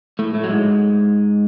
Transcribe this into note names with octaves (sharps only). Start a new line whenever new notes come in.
A2 A3
A2 A3
F#3
G#2 G#3